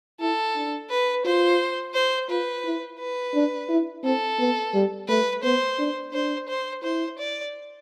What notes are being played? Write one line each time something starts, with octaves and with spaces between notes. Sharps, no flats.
E4 A4
D4
B4
F4 C5
C5
F4 B4
E4
B4
D4
E4
C4 A4
B3
G3
A3 B4
B3 C5
D4
D4 C5
C5
E4 C5
D5